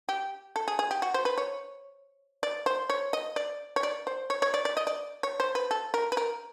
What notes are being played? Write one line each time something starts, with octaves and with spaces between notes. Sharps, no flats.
G4
A4
G#4
G#4
G4
F#4
C5
B4
C#5
D5
C5
C#5
D#5
D5
C#5
D5
C5
C#5
C#5
D5
D5
D#5
D5
C#5
C5
B4
A4
A#4
B4
A#4